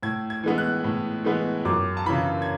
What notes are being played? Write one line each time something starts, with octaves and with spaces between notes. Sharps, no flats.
A2 G#6
G#6
E3 G#3 B3
F#6
A2
E3 G#3 B3
F#2 D6
A5
C#3 E3 B5
G#6